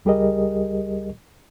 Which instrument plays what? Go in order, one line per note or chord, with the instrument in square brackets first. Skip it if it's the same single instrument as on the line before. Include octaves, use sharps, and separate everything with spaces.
[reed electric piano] C#2 G3 G4 G#4 A#4 D#5